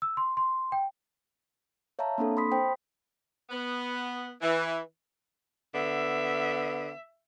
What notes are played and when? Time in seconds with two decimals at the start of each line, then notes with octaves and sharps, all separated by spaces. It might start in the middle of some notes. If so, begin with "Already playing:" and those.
0.02 E6
0.17 C6
0.37 C6
0.72 G5
1.99 C#5 E5 F5 A5 A#5
2.18 A#3 C4 D4 A4
2.37 B5 C6 D#6 B6
2.52 C5 G5
3.49 B3
4.41 E3
5.75 D3 B3 E5